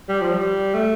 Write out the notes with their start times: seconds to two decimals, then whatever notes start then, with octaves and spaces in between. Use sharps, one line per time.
0.09 G3
0.22 F3
0.34 G3
0.74 A3